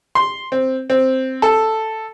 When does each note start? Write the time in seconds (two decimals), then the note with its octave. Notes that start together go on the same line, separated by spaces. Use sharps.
0.15 C6
0.52 C4
0.90 C4
1.42 A4